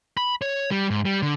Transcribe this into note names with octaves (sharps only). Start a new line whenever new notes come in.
B5
C#5
G3
G#2
G3
D3